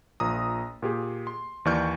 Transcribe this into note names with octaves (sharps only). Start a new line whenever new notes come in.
A#1 A#2 A#5 D#6
A#2 G4 G#4
C6
D#2 E3 D5 C#6 F6 G6